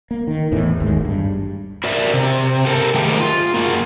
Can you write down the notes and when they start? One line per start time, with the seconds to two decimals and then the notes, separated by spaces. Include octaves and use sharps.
0.11 A#3
0.27 D#3
0.52 E2 A2 E3
0.80 G#1 D#2 G#3
1.05 G2
1.84 F#4 A#4 D5 E5
2.13 C3
2.65 G4 A4 A#4
2.94 D#3 A3 G4 G#4 C5
3.20 F4
3.54 A#3 F#4 G#4